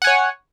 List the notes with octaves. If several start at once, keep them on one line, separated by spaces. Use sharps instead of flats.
C#5 F#5 G#5